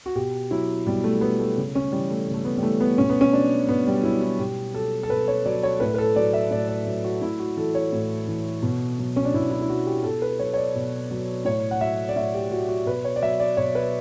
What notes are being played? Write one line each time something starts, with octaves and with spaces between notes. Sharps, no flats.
F#4
B2 G4
F#3 E4
B2 G3
A3
F#3 B3
A3
C#3
C#4
E3 G3
A3
C#3
A3
B3
G3
E3 A3
B3
B2 C#4
B3
C#4
F#3 D4
B2 B3
G3
F#3 E4
E4
B2 G4
F#3 A4
A4
B2 B4
C#5
F#3 D5
C#5
A2 B4
B4
A4
F#3 D5
E5
A2 D5
D5
F#3
F#4
A2 E4
F#4
E3 A4
C#5
A2
E3
B2
F#3
C#4
D4
B2 E4
E4
E4
F#3 F#4
G4
B2 A4
B4
F#3 C#5
C#5
D5
B2
F#3
A2 C#5
F#5
F#3 E5
D5
A2 E5
G4
F#3 F#4
F#4
B2 B4
C#5
D5
F#3 E5
D5
B2 C#5
B4